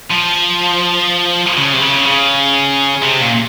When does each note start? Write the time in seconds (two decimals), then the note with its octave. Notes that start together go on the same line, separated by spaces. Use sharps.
0.11 F3
1.57 C#3
1.73 C3
1.81 C#3
2.05 C#3
3.03 C3
3.21 A#2